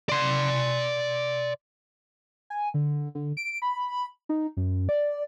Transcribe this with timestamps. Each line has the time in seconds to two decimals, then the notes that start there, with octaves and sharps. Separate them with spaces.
0.09 D5 C6
2.50 G#5
2.74 D3
3.15 D3
3.37 D7
3.62 B5
4.29 D#4
4.57 F#2
4.89 D5